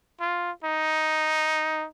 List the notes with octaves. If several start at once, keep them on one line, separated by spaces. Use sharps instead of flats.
F4
D#4